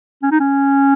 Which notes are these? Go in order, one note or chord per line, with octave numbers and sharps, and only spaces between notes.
C#4
D#4
C#4